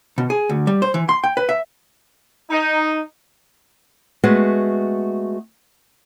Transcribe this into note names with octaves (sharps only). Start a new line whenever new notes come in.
B2
G#4
D2
G3
C5
E3
C6
G5
B4
E5
D#4
G#3 A3 B3 F#4 G#4